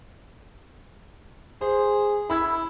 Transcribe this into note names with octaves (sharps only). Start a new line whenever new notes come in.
G#4 C5
E4 B5 E6 G#6